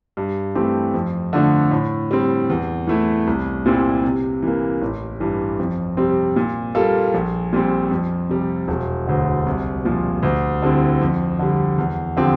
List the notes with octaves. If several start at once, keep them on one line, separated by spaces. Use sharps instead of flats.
G2
E3 A3 C4 G4
F2
D3 F3 A3 D4
A2
G3 C4
E2
E3 A3 E4
C2
A#2 G3 C4 E4
C3
E3 A#3
A1
G2 E3
F2
C3 G3 C4
A#2
G3 A#3 F4 A4
A#1
A#2 G3 C4
F2
C3 G3
E1
D2 D3
C2
A#2 F3
D2
D3 G3 C4 E4
F2
D3 G3
E2
D3 F3 C4 G4